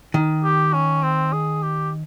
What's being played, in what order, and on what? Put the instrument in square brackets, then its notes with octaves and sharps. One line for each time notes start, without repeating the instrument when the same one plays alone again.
[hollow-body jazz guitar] D#3
[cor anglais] G4
C#4
C4
G#4
G4